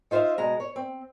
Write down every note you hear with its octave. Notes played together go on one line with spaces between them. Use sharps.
D#4 F4 C5 E5 F5
B2 G#3 A#5
C#5
C4